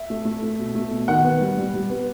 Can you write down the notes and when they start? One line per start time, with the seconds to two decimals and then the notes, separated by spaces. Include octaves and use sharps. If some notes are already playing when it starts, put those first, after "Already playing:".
Already playing: E5
0.10 A3
0.25 A3
0.42 A3
0.58 B2
0.75 A3
0.91 B2
1.08 D#3 F#5
1.24 B3
1.41 G3
1.57 G3
1.74 G3
1.90 B3